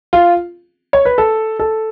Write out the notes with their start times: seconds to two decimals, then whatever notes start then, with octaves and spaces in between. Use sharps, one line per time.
0.13 F4
0.93 C#5
1.05 B4
1.18 A4
1.59 A4